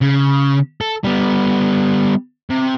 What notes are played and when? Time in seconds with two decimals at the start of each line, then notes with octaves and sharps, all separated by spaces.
0.01 C#3
0.81 A4
1.04 G3 B3
2.50 C3